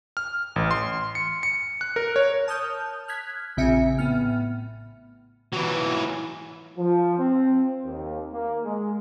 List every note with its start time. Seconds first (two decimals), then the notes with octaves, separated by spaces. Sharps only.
0.17 F6
0.56 A1
0.71 C6
1.15 C#7
1.43 C#7
1.81 F#6
1.96 A#4
2.16 C#5
2.48 A5 D#6 F6 G6
3.08 F6 F#6 G#6 B6
3.57 A#1 C#3 C4 E5 G#5 C#7
3.98 A2 B3 F6
5.53 E3 F#3
6.77 F3
7.18 C4
7.84 D#2
8.32 A#3
8.64 G#3